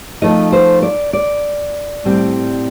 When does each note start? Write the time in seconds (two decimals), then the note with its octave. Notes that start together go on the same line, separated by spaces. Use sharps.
0.22 F3 A3 D#4 D#5
0.52 C5
0.82 D5
1.13 D5
2.04 A2 G3 C4